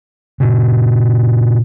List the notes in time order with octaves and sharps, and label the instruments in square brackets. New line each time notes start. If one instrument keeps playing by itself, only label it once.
[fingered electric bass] A#2 C#3